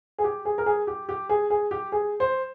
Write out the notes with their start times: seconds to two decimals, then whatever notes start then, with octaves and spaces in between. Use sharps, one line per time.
0.18 G#4
0.24 G4
0.45 G#4
0.58 A#4
0.66 G#4
0.87 G4
1.09 G4
1.29 G#4
1.50 G#4
1.71 G4
1.92 G#4
2.20 C5